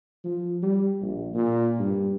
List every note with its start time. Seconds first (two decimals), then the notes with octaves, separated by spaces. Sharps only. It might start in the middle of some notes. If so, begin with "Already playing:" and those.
0.24 F3
0.63 G3
1.01 A#1
1.34 A#2
1.79 G2